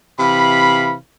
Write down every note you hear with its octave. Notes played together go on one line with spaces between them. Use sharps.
C3 E3 F5 B5